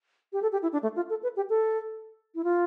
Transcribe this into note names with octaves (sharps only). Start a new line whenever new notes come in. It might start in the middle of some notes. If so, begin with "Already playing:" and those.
G4
A4
G4
E4
D4
A3
F4
A4
B4
G4
A4
E4
F4